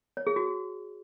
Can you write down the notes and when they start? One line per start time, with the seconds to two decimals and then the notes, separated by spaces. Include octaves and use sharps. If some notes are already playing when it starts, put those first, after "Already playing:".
0.17 C#5
0.27 G#4
0.36 F#4